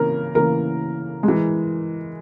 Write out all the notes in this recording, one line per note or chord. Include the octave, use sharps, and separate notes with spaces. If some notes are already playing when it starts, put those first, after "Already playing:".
Already playing: C#3 E3 A#3 A#4
C#3 E3 A#3 A#4
G#3
E3